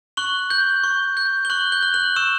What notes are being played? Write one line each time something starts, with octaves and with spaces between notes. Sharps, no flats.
C#6 F#6 F#7
G6
C#6
G6
G7
C#6 F#6 F#7
G6 G7
F#6
F#6 F#7
C#6 E6 E7